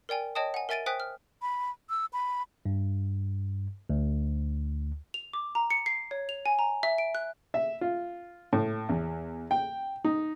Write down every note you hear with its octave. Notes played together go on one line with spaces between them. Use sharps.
A#4 D5 G5 G#5
C#5 D#5 G5 A5 D#6
F#5 G#5
A#4 E5 G#5 A6 D7 D#7
C5 G5 G#5 D#6 F#6 B6
F6
B5
E6
B5
G2
D2
F7
D6
A#5
C#7
C7
C#5
F7
G#5
A#5
E5
D7
F#6
E5
F4
A2
E2
G5
D#4